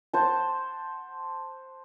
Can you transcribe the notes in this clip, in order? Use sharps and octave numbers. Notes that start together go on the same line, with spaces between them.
C5 F#5 A5